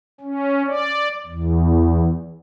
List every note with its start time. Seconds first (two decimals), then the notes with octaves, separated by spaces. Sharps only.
0.20 C#4
0.67 D5
1.26 E2